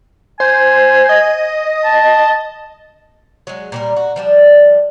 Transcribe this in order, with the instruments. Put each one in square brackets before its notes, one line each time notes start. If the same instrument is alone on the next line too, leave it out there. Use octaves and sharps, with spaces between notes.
[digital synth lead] C5 [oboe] G#5
[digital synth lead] D#5
[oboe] A5
[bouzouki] F#3 G#3
A#2 G3 A#4
F#4
F3 G3 D4